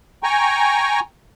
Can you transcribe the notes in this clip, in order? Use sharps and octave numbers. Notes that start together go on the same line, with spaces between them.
G5 G#5 A#5 C#6